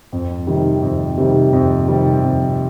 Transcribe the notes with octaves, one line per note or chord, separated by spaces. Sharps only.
F2
C3 D#3 G3
F2
C3 D#3 G3
F2
C3 D#3 G3
F2